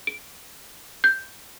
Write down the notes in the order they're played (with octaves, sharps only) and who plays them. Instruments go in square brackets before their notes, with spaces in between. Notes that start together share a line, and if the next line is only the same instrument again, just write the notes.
[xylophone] D7
G6